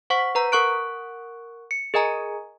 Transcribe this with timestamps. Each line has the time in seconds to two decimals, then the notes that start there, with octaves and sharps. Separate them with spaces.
0.10 C5 F#5 C#6 B6
0.35 B4 A#5 G6
0.52 A#4 F#5 C#6 F#6 D7
1.71 C#7
1.94 G#4 A#4 D#5 G#5 A#5